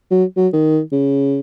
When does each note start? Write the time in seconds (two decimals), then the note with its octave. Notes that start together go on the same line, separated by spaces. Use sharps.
0.11 F#3
0.37 F#3
0.53 D#3
0.92 C#3